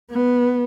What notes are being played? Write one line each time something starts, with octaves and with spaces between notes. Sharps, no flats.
B3